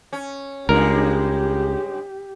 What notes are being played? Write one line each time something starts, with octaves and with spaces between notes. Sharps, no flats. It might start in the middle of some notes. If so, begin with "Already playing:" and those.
C#4
C#2 G2 C#3 G#3 G4 A#4